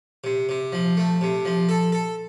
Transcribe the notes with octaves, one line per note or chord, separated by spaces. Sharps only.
C3
C3
F3
A3
C3
F3
A4
A4